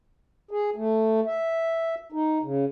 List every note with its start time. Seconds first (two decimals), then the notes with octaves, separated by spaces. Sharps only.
0.51 G#4
0.76 A3
1.26 E5
2.12 D#4
2.43 C#3